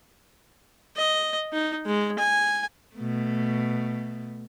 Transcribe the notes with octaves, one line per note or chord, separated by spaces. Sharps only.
D#5
D#4
G#3
G#5
B2 A3